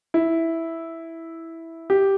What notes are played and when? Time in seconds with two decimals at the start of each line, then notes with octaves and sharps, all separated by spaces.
0.14 E4
1.90 G4